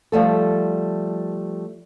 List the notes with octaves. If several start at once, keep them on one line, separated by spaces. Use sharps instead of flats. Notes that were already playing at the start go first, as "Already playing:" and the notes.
F3 G3 A3 A4